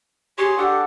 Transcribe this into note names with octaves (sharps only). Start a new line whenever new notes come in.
G4 G#4 C#5 C6
D4 G4 A4 F#5